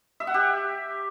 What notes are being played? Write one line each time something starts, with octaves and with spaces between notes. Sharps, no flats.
E5
F#5
G4